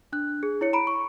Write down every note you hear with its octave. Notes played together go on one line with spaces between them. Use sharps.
D4 F#6
G#4
E4 C#5 C#7
A#5 B5 D7
C#6